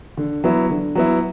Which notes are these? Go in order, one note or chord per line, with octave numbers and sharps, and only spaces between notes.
D3
F#3 B3 E4
D3
F#3 B3 E4